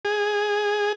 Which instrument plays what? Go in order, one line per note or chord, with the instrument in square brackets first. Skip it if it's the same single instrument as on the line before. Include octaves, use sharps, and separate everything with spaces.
[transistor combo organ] G#4